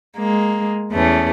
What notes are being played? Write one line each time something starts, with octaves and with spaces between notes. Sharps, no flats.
G#3 A#3
E2 A3 C#4